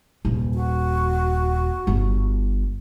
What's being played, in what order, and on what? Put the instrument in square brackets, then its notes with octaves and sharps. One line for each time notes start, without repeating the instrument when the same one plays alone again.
[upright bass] D#1
[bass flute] F#4
[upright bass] G1